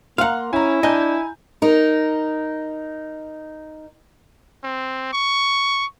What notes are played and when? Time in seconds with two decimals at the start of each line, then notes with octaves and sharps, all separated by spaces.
0.18 A#3 F5 F#5 A#5 C6
0.53 C#4 E4 G#5 A#5
0.83 D4 D#5 G#5 A#5 G6
1.62 D#4 A#4
4.64 C4
5.13 C#6